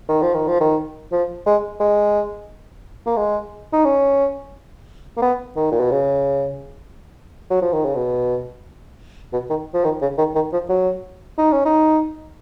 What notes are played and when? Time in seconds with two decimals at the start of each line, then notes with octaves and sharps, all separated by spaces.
0.08 D#3
0.22 F3
0.34 D#3
0.48 F3
0.61 D#3
1.12 F3
1.46 G#3
1.80 G#3
3.06 A#3
3.17 G#3
3.73 D#4
3.84 C#4
5.17 A#3
5.22 B3
5.56 D#3
5.72 A#2
5.80 B2
5.91 C#3
7.50 F#3
7.62 F3
7.72 D#3
7.85 C#3
7.95 B2
9.33 B2
9.50 D#3
9.74 F3
9.84 D#3
10.02 C#3
10.18 D#3
10.35 D#3
10.53 F3
10.69 F#3
11.38 D#4
11.52 C#4
11.65 D#4